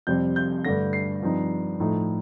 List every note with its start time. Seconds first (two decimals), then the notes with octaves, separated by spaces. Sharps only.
0.07 F2 C3 G3 C4 G6
0.36 G6
0.65 G2 D3 A3 A#6
0.93 C7
1.22 G2 F3 C4 D#4
1.80 A2 F3 A3 D#4